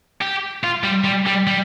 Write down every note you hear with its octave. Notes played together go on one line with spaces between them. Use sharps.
G4
F4
G3
G3
G3
G3